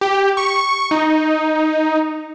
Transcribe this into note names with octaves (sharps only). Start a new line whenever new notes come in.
G4
C#6
D#4